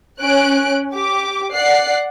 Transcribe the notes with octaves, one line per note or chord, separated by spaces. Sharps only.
C#4 F#6 D7
G4 D6
D5 F#5 F#6 C7